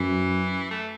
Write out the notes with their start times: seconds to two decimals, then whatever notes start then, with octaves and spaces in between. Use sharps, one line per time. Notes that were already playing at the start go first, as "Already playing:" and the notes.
Already playing: F#2 E3
0.71 A3